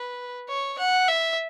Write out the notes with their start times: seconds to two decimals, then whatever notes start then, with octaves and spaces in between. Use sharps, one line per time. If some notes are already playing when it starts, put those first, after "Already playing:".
Already playing: B4
0.48 C#5
0.78 F#5
1.08 E5